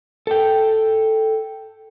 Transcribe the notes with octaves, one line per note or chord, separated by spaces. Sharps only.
A4 G5